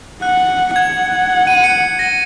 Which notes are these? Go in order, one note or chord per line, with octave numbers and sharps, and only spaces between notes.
F#5 F#6
F#5 G#6
D#7
C#7
A#6